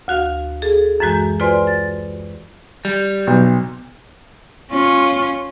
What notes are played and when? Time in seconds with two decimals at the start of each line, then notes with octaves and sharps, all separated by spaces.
0.08 D2 F#4 F5
0.62 G#4 A4
1.00 F#2 E3 G#3 F#4 G6
1.40 F4 B4 C5 D5 G#5 C6
1.67 A6
2.85 G3
3.27 B1
4.72 C#4 F4